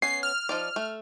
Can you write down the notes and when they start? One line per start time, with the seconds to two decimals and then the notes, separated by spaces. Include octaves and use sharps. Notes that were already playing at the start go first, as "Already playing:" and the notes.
0.02 B3 C#4 C7
0.23 F6
0.49 F3 D#4 D5
0.76 A3